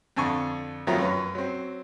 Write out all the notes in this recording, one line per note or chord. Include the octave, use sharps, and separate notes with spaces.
F2 D3 G#5 C#6
F2 D#3 F3 F#3 A3 A#5
F#2 C#4 B4
F#3 C4